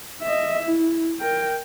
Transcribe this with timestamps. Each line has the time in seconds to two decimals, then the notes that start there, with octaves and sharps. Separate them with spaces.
0.22 D#5 E5
0.64 E4
1.20 A#4 G5